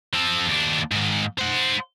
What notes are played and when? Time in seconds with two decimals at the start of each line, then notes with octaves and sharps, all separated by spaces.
0.14 F3 A4
0.46 D#2 D4
0.92 G#2 D#3
1.38 C5 F#5